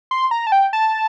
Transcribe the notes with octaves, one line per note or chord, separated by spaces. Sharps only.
C6
A#5
A5
G5
A5